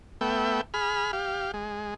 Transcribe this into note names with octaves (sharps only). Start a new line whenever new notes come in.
A3 B3 E5 G5
G#4 B5 F6
G4 F5
G#3